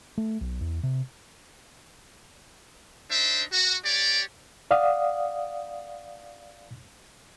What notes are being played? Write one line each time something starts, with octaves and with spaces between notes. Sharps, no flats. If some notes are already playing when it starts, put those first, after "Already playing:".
A3
B1
E2
C3
D4 D#4 C5 E5
F#4
G4 C#5 D5
D5 F5 F#5 D#6